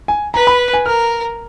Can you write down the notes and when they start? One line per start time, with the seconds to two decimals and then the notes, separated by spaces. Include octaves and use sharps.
0.08 G#5
0.34 B4 A#5
0.47 B5
0.73 G#5
0.86 A#4 F6